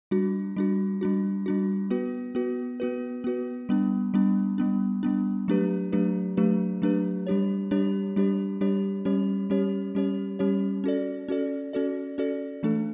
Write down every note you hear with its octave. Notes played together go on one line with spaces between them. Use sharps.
G3 D4 F#4
G3 D4 F#4
G3 D4 F#4
G3 D4 F#4
B3 F#4 B4
B3 F#4 B4
B3 F#4 B4
B3 F#4 B4
G3 B3 D4
G3 B3 D4
G3 B3 D4
G3 B3 D4
F#3 A3 D4 G4 B4
F#3 A3 D4 G4 B4
F#3 A3 D4 G4 B4
F#3 A3 D4 G4 B4
G3 D4 G4 C#5
G3 D4 G4 C#5
G3 D4 G4 C#5
G3 D4 G4 C#5
G3 C#4 G4 C#5
G3 C#4 G4 C#5
G3 C#4 G4 C#5
G3 C#4 G4 C#5
C#4 F#4 A4 D5
C#4 F#4 A4 D5
C#4 F#4 A4 D5
C#4 F#4 A4 D5
E3 A3 D4 A4